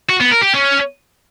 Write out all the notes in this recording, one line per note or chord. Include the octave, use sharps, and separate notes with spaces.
F#4
B3
A#4
G4
C#4